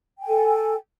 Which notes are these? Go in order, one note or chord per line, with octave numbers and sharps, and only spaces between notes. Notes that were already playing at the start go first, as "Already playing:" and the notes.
A4 G5 G#5